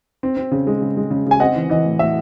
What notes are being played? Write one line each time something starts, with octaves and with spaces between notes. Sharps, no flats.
C4
C4
C#3
G#3
C#3
G#3
C#3
C#3 G#5
C4 D#5 F#5
E3
E3 D#5
A2
A2 E5